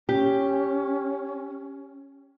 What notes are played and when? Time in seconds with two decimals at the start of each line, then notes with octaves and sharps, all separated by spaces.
0.09 C#4 G4